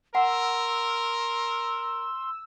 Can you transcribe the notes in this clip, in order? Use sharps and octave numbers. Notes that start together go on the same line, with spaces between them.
A#4 F#5 C6 E6